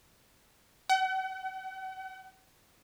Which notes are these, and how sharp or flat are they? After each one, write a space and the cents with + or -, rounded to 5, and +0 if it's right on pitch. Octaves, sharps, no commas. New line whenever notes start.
F#5 +40